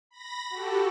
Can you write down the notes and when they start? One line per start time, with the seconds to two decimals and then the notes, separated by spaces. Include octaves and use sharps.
0.11 B5 A#6
0.50 F#4 G4 A4